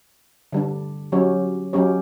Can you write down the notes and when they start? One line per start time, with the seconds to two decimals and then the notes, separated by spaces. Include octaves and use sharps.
0.52 D3 G3 D4
1.12 F#3 C#4 G4 C#5
1.73 F#3 C#4 G4 C#5